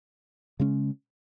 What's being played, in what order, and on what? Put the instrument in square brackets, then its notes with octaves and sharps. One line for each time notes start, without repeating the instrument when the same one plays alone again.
[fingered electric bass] C#3 G#3 C#4